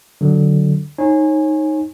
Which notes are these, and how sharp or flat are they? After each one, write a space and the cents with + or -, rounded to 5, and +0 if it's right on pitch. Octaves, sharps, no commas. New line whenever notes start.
D3 +0 F#3 +10
D#4 +0 C#5 -30 G#5 +0